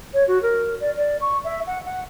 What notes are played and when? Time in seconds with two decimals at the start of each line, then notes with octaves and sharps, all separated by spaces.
0.13 C#5
0.27 F#4
0.42 A#4
0.80 D5
0.96 D5
1.20 C#6
1.44 E5
1.66 F#5
1.85 F#5